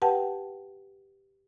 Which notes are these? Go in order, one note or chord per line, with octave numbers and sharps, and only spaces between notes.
G4 B4 F#5 G5 A5